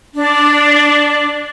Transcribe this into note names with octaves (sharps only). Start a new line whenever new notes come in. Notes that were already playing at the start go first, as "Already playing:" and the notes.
D4